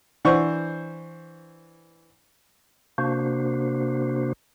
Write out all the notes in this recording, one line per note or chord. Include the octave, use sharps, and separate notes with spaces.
E3 D4 C5 F#5 C#6
C3 A#3 D4 F#4 C5